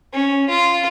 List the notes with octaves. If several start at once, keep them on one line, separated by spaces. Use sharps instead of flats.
C#4
F4